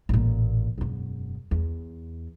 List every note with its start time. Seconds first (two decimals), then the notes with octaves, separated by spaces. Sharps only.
0.09 A1 A#2
0.78 E1 F#2
1.51 E2